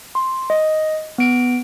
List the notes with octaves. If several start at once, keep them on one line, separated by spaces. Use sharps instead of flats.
C6
D#5
B3 D7